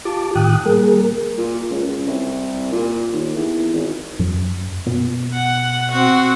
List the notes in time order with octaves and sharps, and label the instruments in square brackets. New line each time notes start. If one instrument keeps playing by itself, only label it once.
[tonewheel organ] F4 G4 A5 D6
A2 D#3 G5 D#6 F#6
G3 A#3 G#4 A#4
[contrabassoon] A#2
C#2
C#2
C2
A#2
D#2
E2
G#1
[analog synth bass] F#2
B2
[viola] F#5
C4 F#4